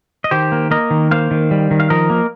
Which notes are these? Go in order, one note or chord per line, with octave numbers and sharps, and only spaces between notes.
D#5
D#3 G4 C5
A#3
A#3 A#4 D#5
D#3
A#3 C5 F5
D#3
G3
D#3
F5
F3 A#4 D#5
A#3